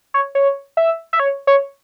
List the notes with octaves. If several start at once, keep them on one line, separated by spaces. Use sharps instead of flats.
C#5
C#5
E5
E5
C#5
C#5